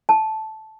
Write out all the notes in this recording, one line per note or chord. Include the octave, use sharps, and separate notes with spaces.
A5